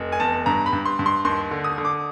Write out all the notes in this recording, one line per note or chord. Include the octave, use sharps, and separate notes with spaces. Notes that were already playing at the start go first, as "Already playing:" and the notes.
Already playing: F1
G#5
E2 A5
G2 A#5
B5
G2
C6
G2
C6
D#2 C6
D3
D#6
D3
D6